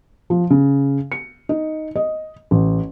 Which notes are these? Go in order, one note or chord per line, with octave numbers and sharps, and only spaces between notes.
F3
C#3
C#7
D#4
D#5
A1